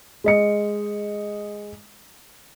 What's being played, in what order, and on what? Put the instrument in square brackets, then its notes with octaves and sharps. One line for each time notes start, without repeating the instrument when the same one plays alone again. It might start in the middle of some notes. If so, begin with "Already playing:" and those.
[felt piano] G#3 D#5 C#7